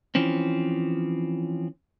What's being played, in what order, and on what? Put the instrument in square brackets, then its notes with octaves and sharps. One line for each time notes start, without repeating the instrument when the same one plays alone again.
[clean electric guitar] E3 F3 C4 C#4